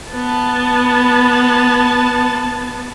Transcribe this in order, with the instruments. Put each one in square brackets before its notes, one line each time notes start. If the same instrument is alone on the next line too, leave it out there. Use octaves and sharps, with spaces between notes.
[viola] B3 A5